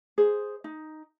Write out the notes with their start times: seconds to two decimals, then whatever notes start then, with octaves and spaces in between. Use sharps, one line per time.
0.18 G#4 C5
0.64 D#4